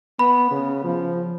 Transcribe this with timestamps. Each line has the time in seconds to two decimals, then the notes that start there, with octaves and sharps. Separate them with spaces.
0.19 B3 B5
0.51 C#3
0.84 F3